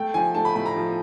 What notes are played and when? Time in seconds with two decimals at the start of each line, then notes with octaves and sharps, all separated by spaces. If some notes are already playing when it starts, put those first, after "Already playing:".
Already playing: A3 G5
0.14 F3 G#5
0.35 A3 A5
0.45 B5
0.55 A2 B5
0.66 A#5
0.76 F3